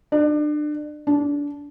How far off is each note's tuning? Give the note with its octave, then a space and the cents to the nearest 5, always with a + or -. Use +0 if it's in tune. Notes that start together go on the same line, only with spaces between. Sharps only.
D4 +30
D4 -25